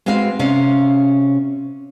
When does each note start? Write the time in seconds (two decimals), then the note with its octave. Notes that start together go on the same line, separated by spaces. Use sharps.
0.06 G#3 C4 F#4 B4 F5
0.39 C3 C#4 F5